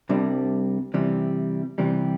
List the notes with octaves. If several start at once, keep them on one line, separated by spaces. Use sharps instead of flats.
C2 C3 G3 D4
C3 E3 G3
C3 E3 G3